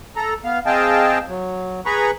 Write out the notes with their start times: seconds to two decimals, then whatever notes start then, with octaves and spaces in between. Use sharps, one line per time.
0.16 A4 A#5
0.44 B3 F5
0.66 C4 G#4 D#5 F5 G5 A5
1.29 F#3
1.86 G#4 B4 A#5 B5 C#6